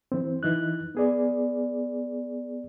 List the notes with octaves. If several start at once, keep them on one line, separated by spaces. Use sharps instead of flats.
E3 C4
E3 D#4 F#6
B3 G#4 D5